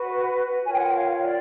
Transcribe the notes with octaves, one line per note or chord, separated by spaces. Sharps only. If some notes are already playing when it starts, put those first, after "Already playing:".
Already playing: F#4 B4
F4 A#4 C#5 G#5
G5
F#5
G5
F5
D5